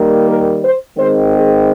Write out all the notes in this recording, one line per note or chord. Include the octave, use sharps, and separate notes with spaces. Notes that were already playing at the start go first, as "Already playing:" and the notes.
Already playing: D#3 G3 A#3
A#4
C5
D#3 G#3 C4 C5
G#4